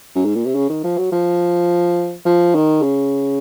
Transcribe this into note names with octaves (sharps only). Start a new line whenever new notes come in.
F#2
G#2
A#2
C3
C#3
D#3
F3
F#3
F3
F3
D#3
C#3